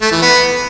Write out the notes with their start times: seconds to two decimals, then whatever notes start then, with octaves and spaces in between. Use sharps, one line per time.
0.01 A3
0.12 E3
0.22 B3